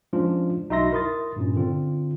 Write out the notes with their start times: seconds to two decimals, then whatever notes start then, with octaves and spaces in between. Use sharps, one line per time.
0.13 F3 G#3 C#4 D4 F4
0.70 B1 D#4 F#4 E5 C6 A#6
0.92 E4 A#4 C6 D#6 A6
1.36 G2 A#2 C#4
1.56 D3 C4 F4